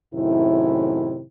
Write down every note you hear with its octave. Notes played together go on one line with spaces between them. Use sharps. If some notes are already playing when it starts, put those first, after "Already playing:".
F#2 A2 C3 D#3 E4